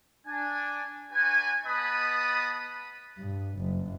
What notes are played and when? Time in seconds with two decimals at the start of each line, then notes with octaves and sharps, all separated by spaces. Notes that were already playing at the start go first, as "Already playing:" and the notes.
0.27 D4 G#5
1.12 D4 F#4 B4 G#5
1.65 B3 B4 D#5 A5 B5 D#6
3.18 G2
3.58 F#1